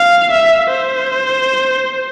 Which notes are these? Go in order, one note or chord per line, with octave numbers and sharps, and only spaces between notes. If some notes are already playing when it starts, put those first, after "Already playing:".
Already playing: F5
E5
C5